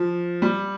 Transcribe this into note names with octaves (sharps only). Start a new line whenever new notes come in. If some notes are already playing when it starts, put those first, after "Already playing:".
Already playing: F3
G3